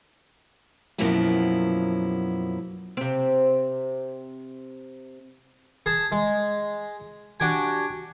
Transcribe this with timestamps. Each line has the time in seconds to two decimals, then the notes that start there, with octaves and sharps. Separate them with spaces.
0.98 F#2 B2 F3 F#3 A#3 E4
2.97 C3 C4
5.86 G#4 A5
6.12 G#3
7.40 D4 F#4 G4 G5 G#5